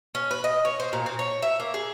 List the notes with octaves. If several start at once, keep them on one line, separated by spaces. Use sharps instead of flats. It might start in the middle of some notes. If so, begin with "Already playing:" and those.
C#4
B4
D#5
C#5
C5
A#2
C4
C#5
E5
A#3
G#4